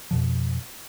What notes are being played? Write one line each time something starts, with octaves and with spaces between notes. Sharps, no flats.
F2 B2 F3